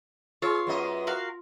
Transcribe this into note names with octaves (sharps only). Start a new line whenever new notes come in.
F4 G#4 C#5 F5 C6
F#2 B3 D#5
F#4 A#4 F5